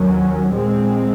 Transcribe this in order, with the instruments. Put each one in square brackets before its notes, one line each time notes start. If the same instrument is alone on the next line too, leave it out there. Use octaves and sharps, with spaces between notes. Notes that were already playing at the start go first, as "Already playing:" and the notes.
Already playing: [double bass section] D#2 D#3 F#3 C#4
A#2 G#3 C4